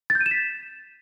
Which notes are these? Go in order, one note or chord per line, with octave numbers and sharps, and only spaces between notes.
A6
G6
D#7
E7
B6